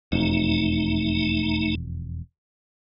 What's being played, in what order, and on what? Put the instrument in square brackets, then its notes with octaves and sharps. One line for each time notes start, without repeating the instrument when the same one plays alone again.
[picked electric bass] E1 F2 [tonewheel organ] A3 D#4